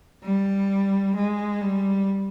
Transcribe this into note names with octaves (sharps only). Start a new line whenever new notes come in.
G3
G#3
G3